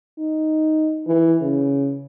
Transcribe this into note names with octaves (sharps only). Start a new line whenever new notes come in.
D#4
E3
C#3